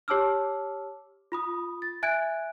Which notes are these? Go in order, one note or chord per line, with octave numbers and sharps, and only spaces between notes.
G4 C#5 A5 D6 E6 F6
F4 B5 D#6
A6
E5 G#5 F#6 G#6 D7